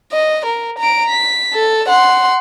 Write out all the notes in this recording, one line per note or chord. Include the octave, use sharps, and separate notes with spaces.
D#5
A#4
A#5 D7
B6
A4
F#5 C6